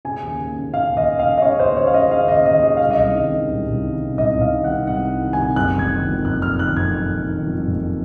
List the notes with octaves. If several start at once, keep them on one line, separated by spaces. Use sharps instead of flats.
C#3 G#5
D#2
D#2
C#3
C#3 F5
D#2
D#5
D#2
F5
C#3
D#5
C#3 C#5
D#2 C5
D#2 C#5
F5
C#3 D#5
C#3 F5
D#2 D#5
D#2 D#5
C#3 D#5
C2 F5
D#5
C2
D#3
C3
C2
C2
D#3
C3
C2 D#5
C2
F5
D#3
F#5
C3
C2 F#5
C2
D#3
G#5
C3
F#1 F#6
F#1
G#6
D#3
F2
F#1 F#6
F#1 F6
D#3 F#6
F2 G#6
F#1
F#1
D#3
F2
F#1